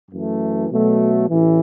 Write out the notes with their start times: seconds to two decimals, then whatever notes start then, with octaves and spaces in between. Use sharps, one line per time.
0.11 F#2 E3 A3
0.70 B2 F#3 A3
1.28 A1 A2 E3